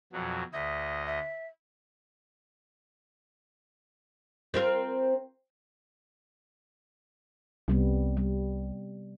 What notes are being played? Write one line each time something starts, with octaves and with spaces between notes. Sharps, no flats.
F2 B2 F#3
D2 D#5 E5
E5
C4 F4 A#4
C2 C3 G3 B3
G3